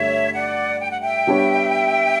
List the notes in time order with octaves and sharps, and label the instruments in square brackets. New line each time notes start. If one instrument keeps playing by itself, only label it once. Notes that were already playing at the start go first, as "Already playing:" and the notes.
Already playing: [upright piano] G2 D3 A3 G4 [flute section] C#5 E5
[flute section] D5 F#5
G5
F#5
E5 G5
[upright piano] G3 B3 D4 G4 C#5